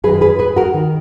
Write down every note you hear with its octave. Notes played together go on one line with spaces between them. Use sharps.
F#2 D#3 G#4 B4
G#4 B4
G#4 B4
F#4 A#4
D#3